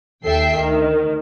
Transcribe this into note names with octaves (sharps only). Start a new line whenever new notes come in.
D#2 A4 E5 G5 C7
D2 D#3